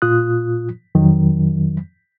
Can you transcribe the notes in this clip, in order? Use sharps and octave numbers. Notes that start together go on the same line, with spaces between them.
A#2 F4 D#6 F#6
F2 D#3 F#3